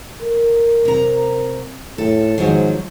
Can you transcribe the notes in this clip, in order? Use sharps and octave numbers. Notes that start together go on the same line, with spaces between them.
A#4
C3 A#5
A2 A4
G#2 D#3 F3 F#3